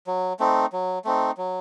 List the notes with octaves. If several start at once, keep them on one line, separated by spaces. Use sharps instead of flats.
F#3
A3 C4 D#4
F#3
A3 C4 D#4
F#3